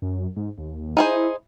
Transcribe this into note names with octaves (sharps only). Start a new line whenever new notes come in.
F#2
G#2
D#2
D#4 E4 G#4 C5